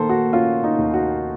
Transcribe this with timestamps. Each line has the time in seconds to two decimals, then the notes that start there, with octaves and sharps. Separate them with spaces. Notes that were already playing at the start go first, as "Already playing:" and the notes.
Already playing: D#3 A#3 A4 C5
0.09 F#4
0.33 C#4 F4
0.64 D#4
0.79 D#2
0.94 F#4